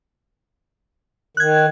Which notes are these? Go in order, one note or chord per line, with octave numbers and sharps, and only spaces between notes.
D#3 F#6 G#6